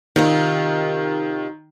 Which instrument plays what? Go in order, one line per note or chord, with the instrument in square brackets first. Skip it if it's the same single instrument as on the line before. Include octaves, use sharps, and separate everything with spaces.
[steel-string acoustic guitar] C3 D#4 F4 [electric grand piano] D#3